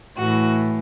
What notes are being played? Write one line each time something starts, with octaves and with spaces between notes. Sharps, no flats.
A2 E3 F#4